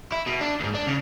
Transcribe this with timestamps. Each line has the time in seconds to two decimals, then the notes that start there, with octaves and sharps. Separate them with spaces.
0.12 E4
0.27 B2
0.41 D4
0.60 D#2 G#2
0.75 D4
0.87 C#3